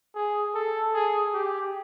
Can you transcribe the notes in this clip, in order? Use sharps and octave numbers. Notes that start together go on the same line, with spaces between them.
G#4
A4
G#4
G4